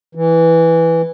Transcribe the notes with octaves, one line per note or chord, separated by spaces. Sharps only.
E3